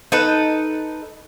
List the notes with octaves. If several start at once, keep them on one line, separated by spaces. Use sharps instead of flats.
D#4 A4 B4